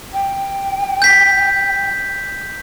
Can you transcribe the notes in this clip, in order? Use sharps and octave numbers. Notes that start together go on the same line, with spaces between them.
G5
G6 B6